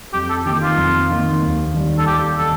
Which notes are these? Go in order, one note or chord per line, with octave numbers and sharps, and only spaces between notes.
F2 G4
A4
D#3 A#3 G4
F4
F2
D#3 A#3
D#2
D#3 G3
A4
D#2 G4
D#3 A4